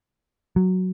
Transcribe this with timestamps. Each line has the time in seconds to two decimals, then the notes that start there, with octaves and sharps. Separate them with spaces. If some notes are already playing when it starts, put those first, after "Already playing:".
0.56 F#3